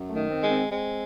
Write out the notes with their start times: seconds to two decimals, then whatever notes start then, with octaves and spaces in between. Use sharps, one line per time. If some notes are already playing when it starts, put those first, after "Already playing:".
Already playing: F#2
0.09 A3
0.15 D#3
0.29 C4
0.43 G#3
0.49 C4
0.70 G#3 C4